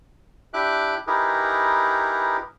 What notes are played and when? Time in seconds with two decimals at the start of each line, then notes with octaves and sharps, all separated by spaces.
0.54 D4 E4 G4 E5 D6 F#6
1.07 D#4 E4 G4 G#4 A#4 B4